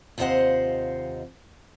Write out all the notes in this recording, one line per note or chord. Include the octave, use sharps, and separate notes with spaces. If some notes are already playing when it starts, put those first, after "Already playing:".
D#2 C3 F4 C5 D#5 F#5